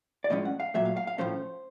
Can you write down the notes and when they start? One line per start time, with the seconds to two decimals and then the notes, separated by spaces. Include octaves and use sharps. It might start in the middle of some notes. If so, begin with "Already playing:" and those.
0.24 D5
0.30 A2 F3 G#3 C#4 D#5
0.45 F#5
0.60 F5
0.74 A#2 F#3 A3 E5
0.85 F5
0.97 F5
1.07 F5
1.18 A2 F3 A3 C#4 C5